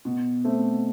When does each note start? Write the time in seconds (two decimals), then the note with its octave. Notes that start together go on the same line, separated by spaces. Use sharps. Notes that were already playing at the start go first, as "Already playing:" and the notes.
0.05 B2
0.44 A3 C4